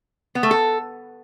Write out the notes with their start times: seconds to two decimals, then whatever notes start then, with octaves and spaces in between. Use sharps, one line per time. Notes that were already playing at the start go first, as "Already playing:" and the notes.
0.35 B3
0.43 A3
0.51 A4